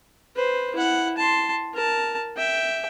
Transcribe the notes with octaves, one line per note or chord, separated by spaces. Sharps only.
B4 C5
E4 F#5
A5 C6
A#4 A5
E5 G5